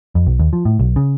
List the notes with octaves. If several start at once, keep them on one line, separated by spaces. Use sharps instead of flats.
F2
B1
D#2
F3
A2
B1
C#3